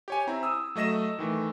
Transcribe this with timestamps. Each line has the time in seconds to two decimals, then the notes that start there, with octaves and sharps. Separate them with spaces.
0.08 G4 C#5 G#5
0.27 C4 E4 A#5
0.43 D#6 E6
0.75 F#3 A3 D#5 A#6 E7
1.19 D#3 E3 A3